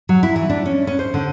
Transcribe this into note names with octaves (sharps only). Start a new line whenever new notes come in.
F#3
E4
E3
D4
C#4
C#4
C5
D3